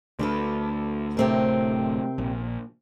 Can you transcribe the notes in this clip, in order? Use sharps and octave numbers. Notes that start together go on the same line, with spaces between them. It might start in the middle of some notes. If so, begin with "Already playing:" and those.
D2 D4 A4 B4
D1 C3 A3 C4 A#4
A#1